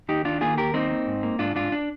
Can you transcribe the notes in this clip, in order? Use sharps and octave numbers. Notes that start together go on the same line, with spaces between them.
D#2 D#4 G4
D#3 D4 F4
A#3 F4 G#4
D#2 G4 A#4
A#3 C4 D#4
A#3
G#2
A#3
G#2 D4 F4
G#2 D4 F4
D4